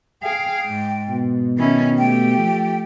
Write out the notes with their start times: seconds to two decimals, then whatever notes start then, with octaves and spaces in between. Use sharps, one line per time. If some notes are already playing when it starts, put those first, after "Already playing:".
0.23 G#4 F5 G5
0.66 G#2
1.09 B2
1.58 D#3 C#4 E4
1.98 A3 G4 G5
2.38 F3